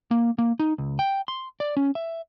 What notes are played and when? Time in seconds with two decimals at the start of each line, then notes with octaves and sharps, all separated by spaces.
0.11 A#3
0.38 A#3
0.59 D#4
0.78 C#2
0.99 G5
1.28 C6
1.60 D5
1.77 C#4
1.95 E5